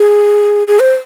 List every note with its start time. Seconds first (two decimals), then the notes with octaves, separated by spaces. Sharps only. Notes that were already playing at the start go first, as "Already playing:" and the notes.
Already playing: G#4
0.67 G#4
0.80 C5